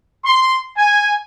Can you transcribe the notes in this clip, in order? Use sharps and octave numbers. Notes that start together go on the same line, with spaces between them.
C6
G#5